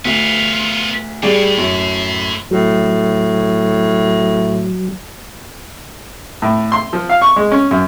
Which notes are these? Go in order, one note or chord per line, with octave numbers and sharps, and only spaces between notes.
D2 B3 F4
A2 G3 G#4 D5
F#2
A2 F#3
A2
C6
F3
F5
C#6
G#3
C#4
F#2